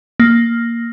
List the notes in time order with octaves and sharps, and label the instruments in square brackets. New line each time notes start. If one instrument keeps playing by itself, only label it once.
[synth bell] A#3